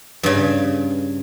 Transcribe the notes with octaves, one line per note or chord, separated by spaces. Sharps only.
G2 C#3